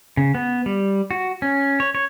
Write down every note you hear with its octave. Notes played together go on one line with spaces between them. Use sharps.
C#3
B3
G3
F#4
C#4
C#5
C#5